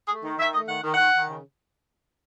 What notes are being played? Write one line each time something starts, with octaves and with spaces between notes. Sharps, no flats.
A3 G#4
D#3
D#3 E5
A3 D#5
D#3 F#5
D#3
D#3 F#5
D#3
C#3